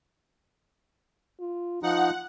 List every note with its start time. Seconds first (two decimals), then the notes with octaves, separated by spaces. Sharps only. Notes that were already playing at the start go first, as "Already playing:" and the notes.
1.40 F4
1.83 F3 D#4 F4 F#5